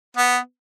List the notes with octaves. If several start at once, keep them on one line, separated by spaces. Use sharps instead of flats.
B3